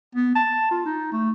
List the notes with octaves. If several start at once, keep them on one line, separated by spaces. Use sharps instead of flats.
B3
A5
F4
D#4
A3